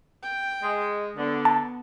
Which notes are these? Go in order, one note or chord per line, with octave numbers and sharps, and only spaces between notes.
G5
G#3
D3 B3
A5